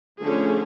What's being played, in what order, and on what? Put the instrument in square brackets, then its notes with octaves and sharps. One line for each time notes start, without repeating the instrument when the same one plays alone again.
[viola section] D3 F3 A3 C#4 G#4